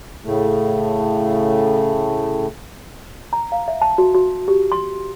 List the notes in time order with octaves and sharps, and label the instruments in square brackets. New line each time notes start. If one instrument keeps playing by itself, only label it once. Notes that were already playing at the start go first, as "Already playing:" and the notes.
[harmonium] A2 C#3 A3
[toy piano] A#5
F5
E5
A5
F#4
F#4
G4
C6